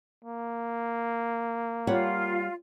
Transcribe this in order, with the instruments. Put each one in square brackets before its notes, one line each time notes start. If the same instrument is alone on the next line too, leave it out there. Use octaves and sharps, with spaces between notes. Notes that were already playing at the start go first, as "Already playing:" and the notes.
[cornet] A#3
[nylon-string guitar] G3 C#5 F#5 [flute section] F4